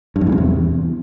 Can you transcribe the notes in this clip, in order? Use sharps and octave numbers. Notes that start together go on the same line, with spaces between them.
G2
F2
A2
C3
E2